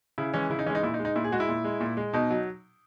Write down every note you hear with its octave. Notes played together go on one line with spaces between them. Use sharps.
C#3 E4
E3 G#3 C#4
C#3 E4
D#4
E3 G#3 C#4
D#4
A#2 E4
D#4
G#3
D#4
A#2 E4
G#4
G#3 F#4
E4
A#2
G#3
A#2
G#3
B2 D#4
F#3